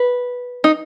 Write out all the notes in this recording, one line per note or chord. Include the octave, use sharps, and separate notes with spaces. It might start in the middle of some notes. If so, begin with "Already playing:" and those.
Already playing: B4
D#4